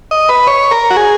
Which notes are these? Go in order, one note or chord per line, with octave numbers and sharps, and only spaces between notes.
D#5
B4
C#5
A#4
F#4
G#4